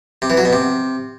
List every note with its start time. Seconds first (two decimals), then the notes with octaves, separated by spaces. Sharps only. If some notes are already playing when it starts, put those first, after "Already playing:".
0.22 C3
0.30 E3
0.37 F#3
0.45 B2
0.53 C3